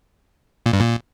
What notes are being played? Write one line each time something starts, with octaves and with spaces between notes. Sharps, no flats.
A#2
G2
A#2